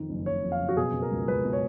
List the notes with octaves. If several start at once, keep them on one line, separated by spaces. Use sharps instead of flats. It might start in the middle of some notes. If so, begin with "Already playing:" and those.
Already playing: F2 D#3
F#1
F#1 C#5
F2
F5
F#1
F#4
B2 G#4
B2
A#4
C#2
C#2 B4
B2
C#5